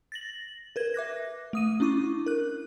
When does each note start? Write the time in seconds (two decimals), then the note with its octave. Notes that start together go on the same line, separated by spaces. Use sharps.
0.12 A6 A#6 F#7
0.76 A#4 B4 G#6
0.94 E5 D6 F#6 A#6
1.53 A3 D#6 D#7
1.80 C#4 D4 E4 C#6 D6
2.26 A#4 F#6